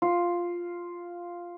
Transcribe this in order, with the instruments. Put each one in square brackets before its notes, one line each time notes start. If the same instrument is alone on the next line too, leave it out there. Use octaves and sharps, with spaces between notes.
[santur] F4